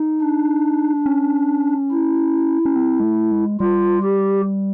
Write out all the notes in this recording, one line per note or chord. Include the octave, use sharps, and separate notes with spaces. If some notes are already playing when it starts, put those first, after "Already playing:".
Already playing: D#4
D4
C#4
E4
C#4
C4
G#3
A3
G#3
G3 F4
G4